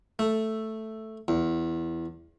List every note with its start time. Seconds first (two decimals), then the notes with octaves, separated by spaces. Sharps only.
0.19 A3
1.28 E2